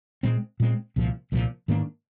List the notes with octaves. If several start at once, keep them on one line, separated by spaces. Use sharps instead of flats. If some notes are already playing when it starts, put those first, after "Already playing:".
A#2 G#3 C4
A#2 G#3 C4
C2 A#2 F3
C2 A#2 F3
G#2 D#3 A#3 D4